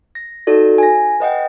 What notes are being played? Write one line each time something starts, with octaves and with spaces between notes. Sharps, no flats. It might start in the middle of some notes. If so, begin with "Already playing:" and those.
A#6
D#4 F#4 A4 D5
G#5 A#6
B4 D#5 F#5 G5